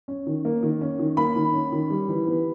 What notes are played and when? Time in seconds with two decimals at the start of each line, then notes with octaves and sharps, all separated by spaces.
0.08 C#4
0.27 D#3
0.45 A#3
0.63 D#3
0.81 C#4
0.99 D#3
1.17 A#3 B5
1.36 D#3
1.54 C#4
1.72 D#3
1.90 G3
2.08 E3
2.27 B3